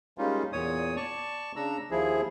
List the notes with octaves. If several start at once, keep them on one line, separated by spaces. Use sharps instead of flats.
G3 G#3 A#3 C#4 D#4 F4
E2 A#2 C#5 D#6
D5 A5 C#6
C#3 D4 A#5 E6
D#2 F3 E4 G#4